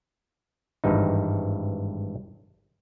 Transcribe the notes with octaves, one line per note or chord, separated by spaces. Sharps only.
G#1 G2 E3 D#4